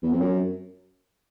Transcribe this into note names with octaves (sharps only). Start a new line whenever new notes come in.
E2
F2
F#2